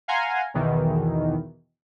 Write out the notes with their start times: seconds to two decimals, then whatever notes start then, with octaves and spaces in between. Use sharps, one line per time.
0.08 F5 F#5 G#5 A#5 C6
0.54 B1 E2 B2 D#3 E3